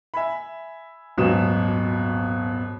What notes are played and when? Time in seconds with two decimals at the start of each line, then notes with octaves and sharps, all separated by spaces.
0.14 E5 G#5 B5
1.17 D#1 G#1 B2 F#3 D#6 E7